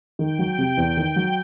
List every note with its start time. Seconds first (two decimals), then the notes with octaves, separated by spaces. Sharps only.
0.19 D#3 G5
0.39 F#3
0.58 C3
0.77 E2
0.97 D#3
1.16 F#3